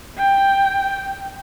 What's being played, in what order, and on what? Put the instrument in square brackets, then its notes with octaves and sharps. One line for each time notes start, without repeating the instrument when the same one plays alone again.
[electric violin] G5